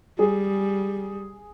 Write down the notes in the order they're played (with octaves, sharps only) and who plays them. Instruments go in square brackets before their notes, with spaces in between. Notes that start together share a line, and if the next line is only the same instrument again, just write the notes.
[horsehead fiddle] G3 [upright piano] G#4